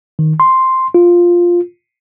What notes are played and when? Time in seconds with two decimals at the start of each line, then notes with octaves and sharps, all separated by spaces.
0.19 D#3
0.40 C6
0.95 F4